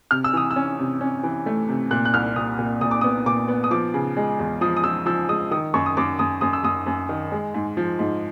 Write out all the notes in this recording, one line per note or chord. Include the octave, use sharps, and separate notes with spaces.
C3 F6
E6
E3 D#6
E6
C#4
C3
C#4
E3
A3
C3
A#2 F#6
F#6
C2 F6
A#2 D#6
A#2
A#2 D#6
D6
D#6
B3
A#2 D6
B3
D#6
F3 D6
C#3
G#3
E2
F3 D#6
D#6
F3 E6
F3 E6
G#3 D#6
D#3 D#6
F#2 C#6
D#6
F#2 D6
F#2 D#6
F#2 D#6
E6
F#2 D#6
F#2
D#3
G#3
G#2
F3
G#2